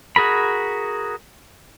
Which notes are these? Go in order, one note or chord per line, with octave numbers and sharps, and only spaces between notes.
F#4 G#4 A#4 B5